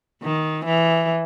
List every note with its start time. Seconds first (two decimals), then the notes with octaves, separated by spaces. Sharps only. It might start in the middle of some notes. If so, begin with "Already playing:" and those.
0.22 D#3
0.65 E3